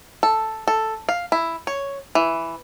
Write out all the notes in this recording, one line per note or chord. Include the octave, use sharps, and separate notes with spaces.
A4
A4
F5
E4
C#5
E3